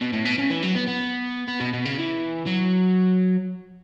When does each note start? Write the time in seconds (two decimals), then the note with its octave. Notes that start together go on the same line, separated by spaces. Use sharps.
0.01 B2
0.13 A2
0.25 B2
0.38 C#3
0.50 E3
0.63 F#3
0.75 B3
0.87 B3
1.48 B3
1.60 B2
1.74 B2
1.85 C#3
1.98 E3
2.47 F#3